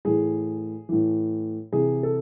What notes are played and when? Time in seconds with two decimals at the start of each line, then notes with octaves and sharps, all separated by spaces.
0.05 A2 E3 G#4
0.89 A2 E3
1.72 C3 E3 G#4
2.03 A4